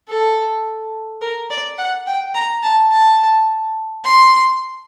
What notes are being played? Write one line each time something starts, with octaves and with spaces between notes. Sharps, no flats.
A4
A#4
D5
F#5
G5
A#5
A5
A5
C6